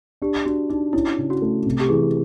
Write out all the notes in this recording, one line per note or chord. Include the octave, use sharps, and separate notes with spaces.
D4 G4
D4 F#4
D4 D#4
C#4 E4
C#3
F#4
A3
C3
G4
E3 G#4